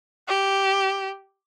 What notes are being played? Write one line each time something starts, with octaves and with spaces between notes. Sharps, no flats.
G4